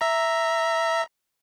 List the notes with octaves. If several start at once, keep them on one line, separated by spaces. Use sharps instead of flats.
E5 A#5